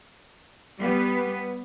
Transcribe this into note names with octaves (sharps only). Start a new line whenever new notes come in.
G3 B3